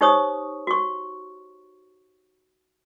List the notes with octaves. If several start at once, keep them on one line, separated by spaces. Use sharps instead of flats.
D#4 G4 C5 C#5 C#6 D#6
F#4 C#6